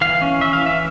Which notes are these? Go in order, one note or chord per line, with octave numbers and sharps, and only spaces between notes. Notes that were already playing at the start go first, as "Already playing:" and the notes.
E3 F5
C#4
E3 E5
F5
E3 E5